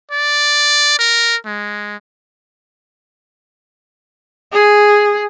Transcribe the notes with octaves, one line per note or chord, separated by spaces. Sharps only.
D5
A#4
G#3
G#4